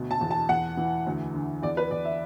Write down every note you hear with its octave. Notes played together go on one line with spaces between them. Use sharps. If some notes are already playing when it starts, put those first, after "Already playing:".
Already playing: D2 B2
A5
E2
A5
E2 F#5
E3
D2
D3
E2 D5
B4
E2 D5
E5